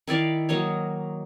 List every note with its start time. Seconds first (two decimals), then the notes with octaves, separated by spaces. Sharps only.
0.07 D#3 E4 D5 F5
0.49 F#3 A#3 D#4 C#5